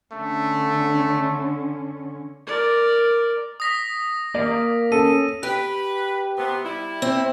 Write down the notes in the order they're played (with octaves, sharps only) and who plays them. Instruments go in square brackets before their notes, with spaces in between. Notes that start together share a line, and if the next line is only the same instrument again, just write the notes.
[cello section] D3 C#4 [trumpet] A3
[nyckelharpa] A#4 D5
[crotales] D#6 A#6 B6
[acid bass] A#3 [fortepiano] D5
[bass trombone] C#4 [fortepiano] A4 [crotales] D#7
[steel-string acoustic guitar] G4 [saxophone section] B4
[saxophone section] C3 B3
G3 E4
[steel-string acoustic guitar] C4